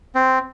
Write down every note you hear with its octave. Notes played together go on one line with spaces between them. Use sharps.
C4